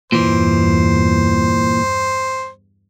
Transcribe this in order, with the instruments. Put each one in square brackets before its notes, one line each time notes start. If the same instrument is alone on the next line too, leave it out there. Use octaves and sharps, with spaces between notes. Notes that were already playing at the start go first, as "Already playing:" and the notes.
[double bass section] E2 G2 [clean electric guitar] A#2 E3 [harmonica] C5